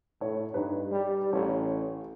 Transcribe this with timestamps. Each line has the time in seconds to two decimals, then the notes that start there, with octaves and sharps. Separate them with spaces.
0.21 A2 C#5
0.54 G2 D#4 B4
0.92 G3
1.33 A1 C#5